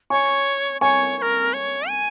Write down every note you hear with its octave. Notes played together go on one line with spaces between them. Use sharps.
C#5 G#5 C#6
C#5 G#5 C#6
C#5
A#4
C#5
G#5